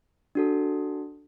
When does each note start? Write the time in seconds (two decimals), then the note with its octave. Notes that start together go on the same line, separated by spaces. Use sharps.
0.35 D4 F#4 A4